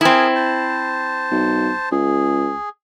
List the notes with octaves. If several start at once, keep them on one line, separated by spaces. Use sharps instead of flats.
C4 E4 G#4 A#4 G#5
C5 A5
B1
C#2 G#4